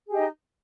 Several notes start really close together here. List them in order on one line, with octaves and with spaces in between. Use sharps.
G#4 G4 D#5 D#4